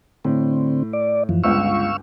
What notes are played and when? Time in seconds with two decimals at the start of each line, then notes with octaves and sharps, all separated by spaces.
0.25 A2 D3 C4
0.93 D5
1.29 F#2 E3 F3
1.44 G1 C#2 F5 C#6 E6